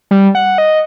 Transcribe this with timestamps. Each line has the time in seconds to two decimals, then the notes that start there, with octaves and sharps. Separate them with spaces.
0.11 G3
0.35 F#5
0.58 D#5